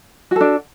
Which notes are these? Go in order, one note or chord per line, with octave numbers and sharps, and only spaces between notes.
D4 F#4 A4